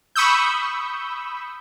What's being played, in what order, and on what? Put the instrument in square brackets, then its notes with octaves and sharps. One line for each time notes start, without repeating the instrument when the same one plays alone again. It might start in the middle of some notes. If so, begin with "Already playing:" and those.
[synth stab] B5 C#6 D#6 E6 G6